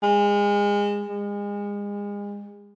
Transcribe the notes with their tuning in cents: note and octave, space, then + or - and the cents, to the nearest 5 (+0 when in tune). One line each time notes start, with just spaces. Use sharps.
G#3 -30
G#3 -35